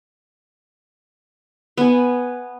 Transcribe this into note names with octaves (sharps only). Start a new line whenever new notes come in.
B3 G#5